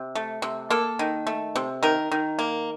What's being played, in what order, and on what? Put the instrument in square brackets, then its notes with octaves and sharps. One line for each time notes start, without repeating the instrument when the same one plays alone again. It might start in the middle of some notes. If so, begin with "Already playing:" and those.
Already playing: [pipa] C3
A3
C3
A#3 A4
D#3
A3
C3
D#3 A#4
D#3
A#3